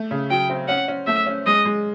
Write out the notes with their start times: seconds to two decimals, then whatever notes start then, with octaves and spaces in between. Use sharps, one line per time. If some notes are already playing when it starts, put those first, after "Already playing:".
Already playing: A3
0.11 C#3
0.30 F#3 G5
0.50 C4
0.68 C#4 F#5
0.88 C#4
1.07 A3 E5
1.26 C#4
1.46 G#3 D#5
1.65 G#3